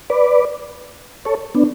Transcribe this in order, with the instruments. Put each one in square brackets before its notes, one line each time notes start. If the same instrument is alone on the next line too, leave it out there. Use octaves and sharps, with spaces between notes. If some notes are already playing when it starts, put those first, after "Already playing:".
[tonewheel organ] B4 D5
A4 C#5
B3 D4